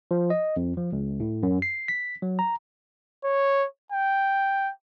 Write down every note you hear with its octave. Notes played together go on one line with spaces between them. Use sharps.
F3
D#5
F2
F3
C#2
A2
F#2
C7
B6
F#3
A#5
C#5
G5